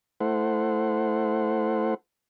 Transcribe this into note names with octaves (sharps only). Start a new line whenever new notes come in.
A3 E4 C5 F#5